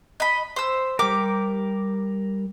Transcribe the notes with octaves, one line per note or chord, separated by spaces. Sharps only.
D#5 B5
C5 E6
G3 G4 A#4 D6